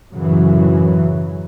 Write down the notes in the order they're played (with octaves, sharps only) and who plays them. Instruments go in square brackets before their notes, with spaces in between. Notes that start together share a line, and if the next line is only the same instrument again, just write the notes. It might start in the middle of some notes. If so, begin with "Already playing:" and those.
[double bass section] F#2 A2 C#3 E3 F#3